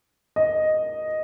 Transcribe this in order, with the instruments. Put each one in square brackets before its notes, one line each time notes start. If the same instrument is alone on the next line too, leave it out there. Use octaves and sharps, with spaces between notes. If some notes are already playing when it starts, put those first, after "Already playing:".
[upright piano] D#5